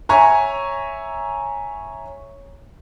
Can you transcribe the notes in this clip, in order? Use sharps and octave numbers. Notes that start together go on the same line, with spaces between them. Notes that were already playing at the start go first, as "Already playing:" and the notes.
C#5 E5 G#5 A#5 C#6